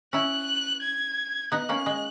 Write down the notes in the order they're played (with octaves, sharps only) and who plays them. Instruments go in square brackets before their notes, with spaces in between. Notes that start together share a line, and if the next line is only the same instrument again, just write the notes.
[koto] C#4 E4 [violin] F#6
[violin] G#6
[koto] B3 D#4 [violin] F#6
[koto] A#3 C#4
G#3